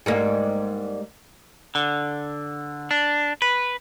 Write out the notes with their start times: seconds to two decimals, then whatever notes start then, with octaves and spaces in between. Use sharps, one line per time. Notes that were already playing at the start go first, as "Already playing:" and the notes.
0.06 G#2 G3 A#3
1.75 D3
2.91 D4
3.42 B4